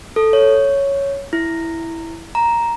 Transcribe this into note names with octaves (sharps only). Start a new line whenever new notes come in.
A4
C#5
E4
A#5